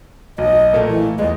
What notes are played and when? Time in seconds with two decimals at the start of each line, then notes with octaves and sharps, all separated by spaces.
0.38 B1 D#5
0.73 A#2 A3 A#3
0.87 E3
1.19 E2 G#3 D#5